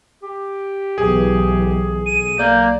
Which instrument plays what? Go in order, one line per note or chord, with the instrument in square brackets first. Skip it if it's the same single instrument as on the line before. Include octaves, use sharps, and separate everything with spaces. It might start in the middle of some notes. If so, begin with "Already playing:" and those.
[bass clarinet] G4
[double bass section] B1 E3 [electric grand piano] G#4
[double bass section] B1 [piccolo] D#7
[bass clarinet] A#3 [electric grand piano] D5 [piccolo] G6